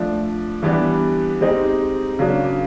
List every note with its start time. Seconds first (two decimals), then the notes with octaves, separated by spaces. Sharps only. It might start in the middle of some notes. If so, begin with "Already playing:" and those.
Already playing: F3 A3 D4
0.63 E3 G3 B3 D4 G4
1.41 G#3 C4 D#4 G4
2.19 C#3 F#3 A#3 D4